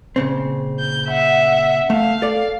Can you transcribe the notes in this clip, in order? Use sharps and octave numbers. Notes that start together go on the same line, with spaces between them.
A#2 C#3 C4
G6
E5 F#5
A3 F5
A4 D5